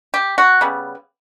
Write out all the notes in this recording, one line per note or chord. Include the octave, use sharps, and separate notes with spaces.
G4
F#4
C#3 G3 B3